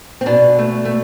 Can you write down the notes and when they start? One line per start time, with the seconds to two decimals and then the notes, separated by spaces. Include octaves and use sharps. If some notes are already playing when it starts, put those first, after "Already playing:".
0.21 C4
0.26 B2 D4
0.58 A3
0.85 A3